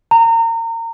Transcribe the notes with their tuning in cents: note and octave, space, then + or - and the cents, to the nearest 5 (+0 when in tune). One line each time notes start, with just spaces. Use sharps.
A#5 -30